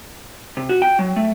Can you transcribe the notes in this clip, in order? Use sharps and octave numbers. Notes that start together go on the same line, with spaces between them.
C3
F#4
G5
F#3
A3